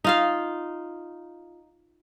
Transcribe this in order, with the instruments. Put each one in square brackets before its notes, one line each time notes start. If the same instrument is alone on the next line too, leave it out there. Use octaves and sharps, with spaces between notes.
[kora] D#4 F4 F5